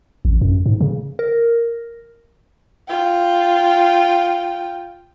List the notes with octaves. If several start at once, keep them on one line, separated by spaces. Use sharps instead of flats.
A1
F#2
G#2
C#3
A#4
F4 G5